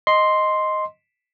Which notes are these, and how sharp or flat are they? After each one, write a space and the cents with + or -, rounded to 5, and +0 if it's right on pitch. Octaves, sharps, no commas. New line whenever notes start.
D#5 +0 C6 +0